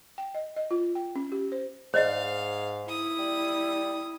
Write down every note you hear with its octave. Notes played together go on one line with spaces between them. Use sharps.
G5
D#5
D#5
F4
G5
C#4
G4
C5
G#2 C5 D5 D#5 F5
E4 D#6
G3